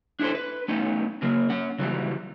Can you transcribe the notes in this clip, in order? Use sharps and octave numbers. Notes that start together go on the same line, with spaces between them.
D4 E4 G#4 A4 C5
B4
A3 B3 C#4 D#4
C#3 F#3 A#3
C#4 F#5
C#3 E3 F#3 G3